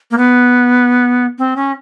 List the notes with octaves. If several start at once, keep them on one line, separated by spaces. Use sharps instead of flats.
A#3
B3
C4
C#4